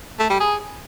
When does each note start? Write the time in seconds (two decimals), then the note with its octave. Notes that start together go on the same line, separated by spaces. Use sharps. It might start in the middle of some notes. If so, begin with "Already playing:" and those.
0.19 A3
0.30 G3
0.40 G#4